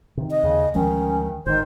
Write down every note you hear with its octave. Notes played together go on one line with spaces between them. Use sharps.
C3 D#3
D#5
D#2 C#3
D2 D#3 F3 G#3 C#4
G#1 D#3 C5